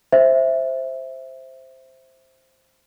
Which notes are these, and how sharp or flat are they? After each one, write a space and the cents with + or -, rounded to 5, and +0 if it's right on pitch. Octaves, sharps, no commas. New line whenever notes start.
C5 +0 E5 +0